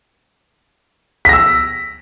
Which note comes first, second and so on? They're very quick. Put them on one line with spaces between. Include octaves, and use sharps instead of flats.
B6 A#6 E6